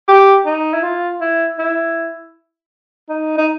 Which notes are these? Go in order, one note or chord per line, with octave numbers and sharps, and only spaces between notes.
G4
D#4
E4
F4
E4
E4
D#4
D#4